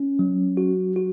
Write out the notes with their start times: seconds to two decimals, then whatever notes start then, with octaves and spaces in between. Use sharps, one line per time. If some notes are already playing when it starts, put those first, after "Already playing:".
Already playing: C#4
0.19 F#3
0.57 F#4
0.96 F#4